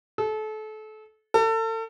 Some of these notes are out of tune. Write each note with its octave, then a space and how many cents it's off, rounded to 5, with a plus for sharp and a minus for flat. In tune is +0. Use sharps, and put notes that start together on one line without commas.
A4 -30
A4 +35